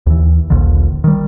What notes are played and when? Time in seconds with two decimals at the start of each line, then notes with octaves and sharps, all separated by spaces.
0.07 D#2 E3
0.50 D#1 A#1 D#2 D3
1.04 D#3 G3